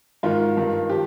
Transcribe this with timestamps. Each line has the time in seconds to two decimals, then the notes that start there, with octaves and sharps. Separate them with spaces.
0.23 G#2 D#3 F4
0.57 G2 D#3
0.89 F3 G4